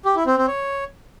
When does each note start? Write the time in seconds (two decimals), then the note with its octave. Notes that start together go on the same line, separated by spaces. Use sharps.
0.05 G4
0.16 E4
0.26 C4
0.37 C4
0.48 C#5